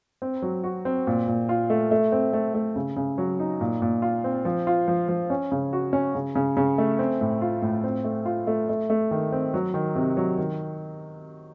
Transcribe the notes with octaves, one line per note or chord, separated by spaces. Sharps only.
C4
F#3
F#4
C4
A#2
A#2
F4
A3
A3
C4
A3
A3
C#3
C#3
F#3
D#4
A#2
A#2
F4
C4
F3
F4
F3
F3
C#4
C#3
F#4
C#4
C#3
C#3
C#3
A3
C4
A2
F4
A2
C4
A3
F4
A3
A3
A3
D#3
C4
F#3
D#3
C3
F#3
D#3